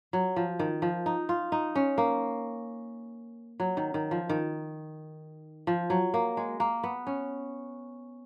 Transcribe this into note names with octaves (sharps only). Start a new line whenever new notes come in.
F#3
F3
D#3
F3
D#4
F4
D#4
C#4
A#3
F#3
D#3
D#3
F3
D#3
F3
F#3
A#3
G#3
A#3
B3
C#4